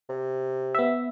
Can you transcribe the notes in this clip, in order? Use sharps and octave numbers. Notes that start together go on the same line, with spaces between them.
C3
B3 E5